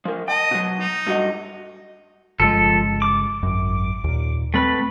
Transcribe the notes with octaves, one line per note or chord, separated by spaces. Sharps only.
F3 A#4
D#5 G5 A5
B2 F#3
D#4
G2 F#4 D#5
G1 C#3 F3 G#3 A4
D6
G#1 F#2
D#2 A#2
A3 C4 B4